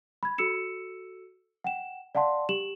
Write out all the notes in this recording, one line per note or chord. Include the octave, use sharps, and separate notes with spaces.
B5 G#6
F#4 A4 E6 C#7 E7
F#5 G5 E7
D5 F5 F#5 A5 C6
G4 E7 F#7